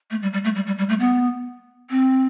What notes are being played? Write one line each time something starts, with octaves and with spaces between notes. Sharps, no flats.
A3
G3
G3
A3
G3
G3
G3
A3
B3
C4